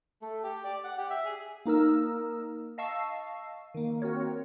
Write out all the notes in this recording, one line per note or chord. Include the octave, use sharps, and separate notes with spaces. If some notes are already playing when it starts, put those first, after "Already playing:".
A3
G4
D5
F#5
G4
E5
G#4
A#3 D#4 A#4 E6
D#5 F5 A5 C#6 E6 C7
D#3 A#3
C4 F#4 A#4 C#5